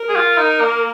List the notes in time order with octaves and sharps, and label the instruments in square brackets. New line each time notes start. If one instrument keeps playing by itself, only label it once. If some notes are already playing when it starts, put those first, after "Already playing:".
Already playing: [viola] A#4
[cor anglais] G#4
F4
D#4
A#3